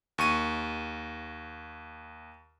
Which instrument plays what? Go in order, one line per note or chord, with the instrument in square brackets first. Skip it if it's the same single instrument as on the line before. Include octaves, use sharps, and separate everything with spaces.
[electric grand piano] D#2 C#6 D#7